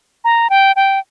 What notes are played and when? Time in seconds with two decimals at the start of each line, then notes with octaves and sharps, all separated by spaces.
0.24 A#5
0.50 G5
0.76 G5